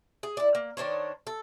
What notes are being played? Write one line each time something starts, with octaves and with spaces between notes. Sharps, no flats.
G#4
E4 D5
A#3
D#3 D4 C5 C#5
A4